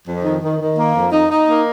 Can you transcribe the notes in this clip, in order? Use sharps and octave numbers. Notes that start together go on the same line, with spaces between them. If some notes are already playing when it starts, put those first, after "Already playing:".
F2
D#3
D#3
D#3
A#3
F2
D#4
D#4
A#3